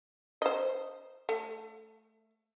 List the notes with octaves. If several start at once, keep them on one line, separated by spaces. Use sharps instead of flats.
C5 D#5
A3